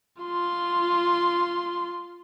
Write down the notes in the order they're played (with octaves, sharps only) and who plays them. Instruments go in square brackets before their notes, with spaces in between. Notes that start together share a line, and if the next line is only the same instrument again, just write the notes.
[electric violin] F4 C6